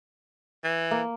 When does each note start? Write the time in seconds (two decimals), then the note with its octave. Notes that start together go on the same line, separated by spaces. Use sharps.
0.64 E3
0.91 A#3